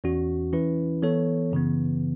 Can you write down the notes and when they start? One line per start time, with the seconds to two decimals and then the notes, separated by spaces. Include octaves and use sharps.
0.04 E2 E3 C#4 F#4
0.53 E3 C#4 E4 B4
1.03 E3 B3 A4 C#5
1.52 F#2 C#3 E3 B3